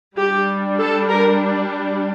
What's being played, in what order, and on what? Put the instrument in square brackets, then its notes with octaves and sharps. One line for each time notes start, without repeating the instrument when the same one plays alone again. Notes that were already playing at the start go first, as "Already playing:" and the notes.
[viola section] G3 D4 G4
A4
A#4